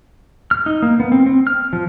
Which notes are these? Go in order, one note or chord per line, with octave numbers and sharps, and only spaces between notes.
F6
D#4
A#3
B3
C4
C4
F6
F3